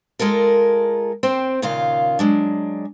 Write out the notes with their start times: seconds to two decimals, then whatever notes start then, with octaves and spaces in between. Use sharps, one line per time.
0.19 G#3 F4 A4 A#4
1.23 C4 C5 G5
1.62 D#2 A#2 C#3 F4 F5
2.19 F#3 G#3 D4